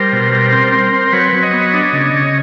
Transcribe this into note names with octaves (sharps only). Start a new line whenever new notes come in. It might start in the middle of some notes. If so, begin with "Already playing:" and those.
Already playing: G3 A#4 C5
B2
G3
C4
C4
C4
C5
F#3 B4 C#5
F#3
C#5 D#5
B3
D4
C#3
C#3